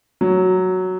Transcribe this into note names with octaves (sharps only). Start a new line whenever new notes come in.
F#3